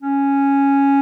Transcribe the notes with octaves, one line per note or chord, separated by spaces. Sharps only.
C#4